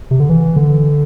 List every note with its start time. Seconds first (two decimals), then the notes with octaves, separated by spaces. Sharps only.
0.11 C3
0.20 D3
0.29 E3
0.56 D3